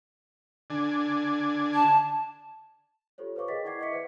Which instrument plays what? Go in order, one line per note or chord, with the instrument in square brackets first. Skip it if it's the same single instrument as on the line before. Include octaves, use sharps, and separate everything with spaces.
[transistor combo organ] D3 D4 G#5
[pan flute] A5
[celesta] F4 G4 A4 C5 C#5
B4 C#5 F5 C#6 D6
G#4 A#4 D#5 G5 A6 B6
E4 D5 F#5 D6 G#6 C7
D#5 E5 C#6 D6 B6 C#7
B4 C5 D5 F#5